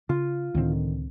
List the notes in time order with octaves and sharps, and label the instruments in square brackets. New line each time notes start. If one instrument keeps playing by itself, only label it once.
[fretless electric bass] C#3 [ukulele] F4
[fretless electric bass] C#2 C4 [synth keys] A2 D3 D#3